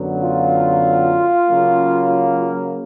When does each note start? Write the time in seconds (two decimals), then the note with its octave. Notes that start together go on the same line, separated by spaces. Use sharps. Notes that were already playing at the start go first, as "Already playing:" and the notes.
Already playing: F#2 D3 F#3 B3
0.23 F4
1.47 C#3 F#3 A#3